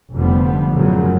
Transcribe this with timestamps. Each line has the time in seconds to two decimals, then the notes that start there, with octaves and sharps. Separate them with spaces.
0.14 F1 F2 D3 F3 G3 B3
0.72 F#2 A2 C#3 F3 F#3